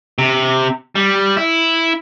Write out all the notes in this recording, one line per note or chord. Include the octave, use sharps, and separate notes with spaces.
C3
G3
E4